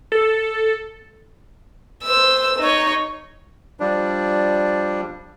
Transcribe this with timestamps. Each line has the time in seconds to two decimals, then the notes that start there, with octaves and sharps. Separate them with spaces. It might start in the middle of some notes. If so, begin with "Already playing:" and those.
0.12 A4
2.04 C5 E6
2.59 D#4 C#5
3.80 F3 G3 D4